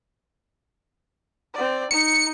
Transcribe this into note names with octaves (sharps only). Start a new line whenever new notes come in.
C4 D5
D#4 C#7